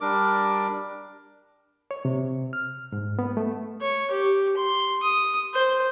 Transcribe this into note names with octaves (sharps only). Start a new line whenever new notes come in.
G3 D4 A#4 D6
C#5
C3
F6
G#2
B3
A3
C#5
G4
C6
D#6
C5